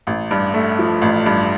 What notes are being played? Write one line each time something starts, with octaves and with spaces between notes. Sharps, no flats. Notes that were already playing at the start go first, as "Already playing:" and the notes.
A1
G2
A3
F3
A1
G2